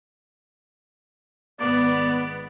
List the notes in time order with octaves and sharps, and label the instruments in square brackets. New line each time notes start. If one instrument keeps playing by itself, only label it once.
[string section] G#1 B3 [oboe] D5